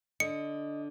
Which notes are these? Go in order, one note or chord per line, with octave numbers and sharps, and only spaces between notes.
D3 D#5 C#7